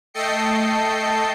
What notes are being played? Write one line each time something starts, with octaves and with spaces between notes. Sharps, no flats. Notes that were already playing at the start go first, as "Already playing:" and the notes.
A3 A4 D#5 G5 C7 C#7